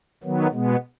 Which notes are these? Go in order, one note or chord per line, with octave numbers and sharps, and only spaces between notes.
D#3 F#3 B3
B2 G#3 B3